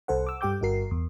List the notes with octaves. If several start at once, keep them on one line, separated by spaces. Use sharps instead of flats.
C2 A4 C5 F#5
D6 E6
G2 G4 G5 D6 G6
G1 G2 F#4 A#4 C7
E2